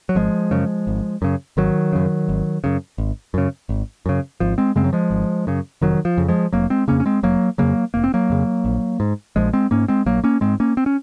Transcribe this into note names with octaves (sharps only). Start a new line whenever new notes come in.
F#3
G#1 F3 G#3
F#2 C#3
G#1
F#2 C#3
G#1 D#3 F#3
F#2 C#3
G#1
F#2 C#3
G#1
F#2 C#3
G#1
F#2 C#3
G#1 F3
G#3 C4
F#2 C#3 G#3 C4
F#3
F3 G#3
G#1
F#2 C#3
F1 D#3 F#3
F3
F2 C#3
F3 G#3
F1 F#3 A#3
G#3 C4
F2 C#3 A#3 C#4
C#4
G#3 C4
F1 F#3 A#3
F2 C#3 F#3 A#3
F1 A#3
C4
F#3 A#3
F2 C#3
A#1
G#2
A#1 F3 G#3
G#3 C4
G#2 A#3 C#4
G#3 C4
A#1 F#3 A#3
A#3 C#4
G#2 G#3 C4
A#3 C#4
C4
C#4